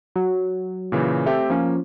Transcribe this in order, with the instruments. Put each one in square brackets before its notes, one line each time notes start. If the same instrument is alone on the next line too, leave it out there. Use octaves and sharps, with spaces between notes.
[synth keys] F#3
[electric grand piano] A#2 C#3 E3
[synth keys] A3 [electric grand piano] C4 G4 A4
[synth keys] F3 C#4 [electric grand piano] A#3